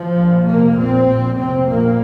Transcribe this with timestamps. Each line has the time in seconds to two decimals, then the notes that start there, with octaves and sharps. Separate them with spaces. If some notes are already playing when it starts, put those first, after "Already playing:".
Already playing: F3
0.17 A#1 A#2
0.47 F1 F2 C3 A#3
0.77 A#1 A#2 C4
1.06 A#1 A#2
1.36 F1 F2 C3 C4
1.65 A#1 A#2 A#3